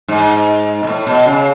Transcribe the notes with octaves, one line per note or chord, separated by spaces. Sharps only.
G#2
B2
A2
B2
C#3